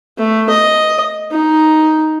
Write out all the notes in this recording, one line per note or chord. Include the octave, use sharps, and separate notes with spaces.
A3
D#5
D#4